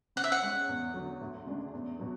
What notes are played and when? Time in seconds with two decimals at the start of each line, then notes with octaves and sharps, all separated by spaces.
0.16 C#3 F#5
0.24 E5
0.32 F#5
0.43 G#3 C#4
0.69 E2
0.94 D3 F#3
1.21 D2
1.46 C#3 G#3 D4
1.73 E2
2.00 B2 F#3